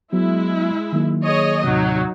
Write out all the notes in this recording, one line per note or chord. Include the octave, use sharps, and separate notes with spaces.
F#3 G#3 B3 E4
D#3 F#3 A#3
G#4 C#5 D#5
D#2 A2 C3 F#3 D#4